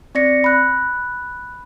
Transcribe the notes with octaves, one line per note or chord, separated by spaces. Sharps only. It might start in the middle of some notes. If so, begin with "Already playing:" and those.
C4 D5 A#6 C#7
B5 F#6